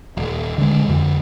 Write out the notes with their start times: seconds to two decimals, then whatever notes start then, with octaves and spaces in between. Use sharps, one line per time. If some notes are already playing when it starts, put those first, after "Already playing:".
0.17 D#1
0.58 D3 G#3
0.86 F2 D3